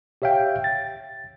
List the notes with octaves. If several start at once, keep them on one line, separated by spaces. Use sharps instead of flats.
G4 C#5 E5 F5 G5
A6